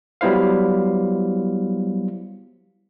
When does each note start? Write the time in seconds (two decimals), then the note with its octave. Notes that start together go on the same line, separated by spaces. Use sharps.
0.21 F#3 G3 B3 E4 C5 F5